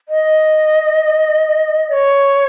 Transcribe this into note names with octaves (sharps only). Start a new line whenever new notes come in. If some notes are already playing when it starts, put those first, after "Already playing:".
D#5
D5
C#5